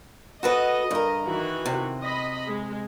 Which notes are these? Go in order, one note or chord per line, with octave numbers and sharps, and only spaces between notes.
F#4 A4 B4 D#5
G2 A#4
D#3 E3 F#4
C3
D#5 B5
G#3